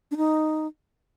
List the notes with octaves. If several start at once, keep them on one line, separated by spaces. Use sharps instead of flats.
D4
D#4